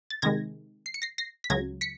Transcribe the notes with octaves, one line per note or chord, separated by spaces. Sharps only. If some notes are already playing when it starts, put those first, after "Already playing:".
A6
C3 D#3 G#3 G#6 A#6
C7
C#7
A#6 C7
A#6 C7
B6
C#2 C#3 F#3 G#6 A#6
B6 C#7